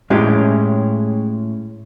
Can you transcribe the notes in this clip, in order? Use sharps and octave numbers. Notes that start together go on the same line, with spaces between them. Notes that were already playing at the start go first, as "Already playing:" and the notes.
A2 G#3 C#4 E4 G4